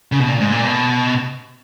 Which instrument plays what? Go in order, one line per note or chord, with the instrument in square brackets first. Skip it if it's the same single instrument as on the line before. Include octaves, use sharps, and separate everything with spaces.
[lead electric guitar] C#3
B2
A#2
G#2
A#2
B2